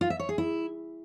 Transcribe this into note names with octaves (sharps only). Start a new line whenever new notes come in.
F4
E5
C#5
G#4
E4